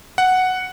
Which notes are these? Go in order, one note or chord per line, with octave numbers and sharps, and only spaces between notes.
F#5